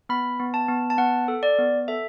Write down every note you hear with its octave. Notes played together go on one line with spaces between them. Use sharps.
B3 B5
B3
A5
B3
A5
B3 F#5
A4
D5
B3
A4 E5